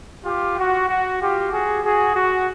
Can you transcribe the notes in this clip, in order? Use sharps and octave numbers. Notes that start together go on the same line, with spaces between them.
F4 G4
F#4
F#4
F4 G4
F#4 G#4
F#4 G#4
F#4